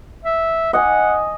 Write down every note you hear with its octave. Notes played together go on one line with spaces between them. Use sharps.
E5
D#5 F#5 G#5